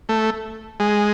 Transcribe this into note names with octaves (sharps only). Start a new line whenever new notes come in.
A3
G#3